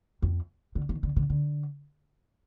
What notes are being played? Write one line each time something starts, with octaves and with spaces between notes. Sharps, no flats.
F2
D3
D#3
D3
D3
D3